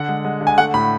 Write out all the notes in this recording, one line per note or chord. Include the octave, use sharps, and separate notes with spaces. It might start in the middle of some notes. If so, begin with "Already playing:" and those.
Already playing: D3 F#5
G#3
G#3
D3
G#5
A3 F#5
A2 B5